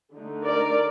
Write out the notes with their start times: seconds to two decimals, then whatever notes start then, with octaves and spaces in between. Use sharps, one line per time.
0.13 D3 A3 D#4
0.43 A#4 D5